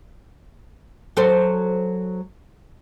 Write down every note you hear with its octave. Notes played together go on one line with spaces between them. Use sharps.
F#3 A4 C5